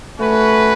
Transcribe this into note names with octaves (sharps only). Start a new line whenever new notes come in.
A3 C#4 F#4 B4